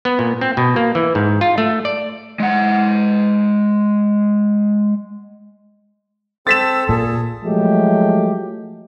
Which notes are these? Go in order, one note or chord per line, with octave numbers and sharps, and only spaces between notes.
B3
A#2
C4
B2
A#3
E3
G#2
F4
A3
D5
G#3 F#5
C4 A4 C5 E6 A6 B6 E7
A#2 G#4
F3 F#3 G#3 A3 G4